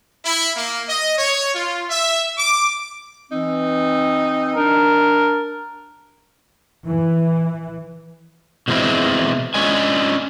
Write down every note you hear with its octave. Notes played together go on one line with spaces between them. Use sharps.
E4
A#3
D#5
C#5
F4
E5
D6
E3 C4 D#4
D4 A#4
E3
B2 E3 G#3 C4 E4
G#3 C#4 D4 D#5 G#5